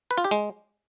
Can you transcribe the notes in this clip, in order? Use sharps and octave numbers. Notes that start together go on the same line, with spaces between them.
B4
F4
G4
G#3